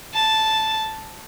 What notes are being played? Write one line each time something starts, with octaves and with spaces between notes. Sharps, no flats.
A5